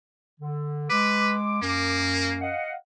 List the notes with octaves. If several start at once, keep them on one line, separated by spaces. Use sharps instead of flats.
D3
G#3 B4 D6
F#2 A#3
D#5 F5 F#5